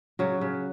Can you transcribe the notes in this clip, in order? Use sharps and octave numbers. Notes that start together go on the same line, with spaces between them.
C#3 F#3 F#4
C#3